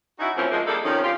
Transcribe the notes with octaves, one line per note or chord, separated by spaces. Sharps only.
C#4 D#4 E4 F#4
E3 F3 A3 A#3 C4 C#4
F3 G#3 A#3
G3 A#3 D4 E4 G#4 A4
C3 D#3 F3 C#4
F4 G4